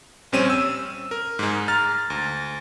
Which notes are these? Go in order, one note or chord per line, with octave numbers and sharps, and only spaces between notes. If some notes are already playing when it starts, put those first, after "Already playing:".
A#1 G3 C4 C#4 D#7
E6
A#4
G#2 G#3
A#5 F6 A6
D2